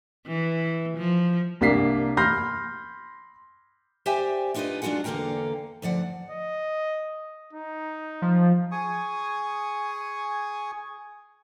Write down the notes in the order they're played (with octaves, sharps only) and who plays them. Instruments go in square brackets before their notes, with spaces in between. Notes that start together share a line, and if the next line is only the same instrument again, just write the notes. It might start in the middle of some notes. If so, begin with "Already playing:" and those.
[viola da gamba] E3
F3
[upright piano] C2 A#3 D4 B6 C7
B5 C6 F6 G6 A#6 C7
[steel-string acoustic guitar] G4 C5 D5 E5 G5 G#5
D4 D#4 F4 F#4 B4 D#5
G#3 D4 F4 F#4 G#4 F#5
E2 D3 A#3 F5 G5 A#5
D2 F3 D5 F#5
[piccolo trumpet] D#5
D#4
[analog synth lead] F3
[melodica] G#4 G#5 C#6 D#6